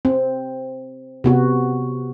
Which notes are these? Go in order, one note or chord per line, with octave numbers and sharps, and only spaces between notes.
C4
C3 B3 F#4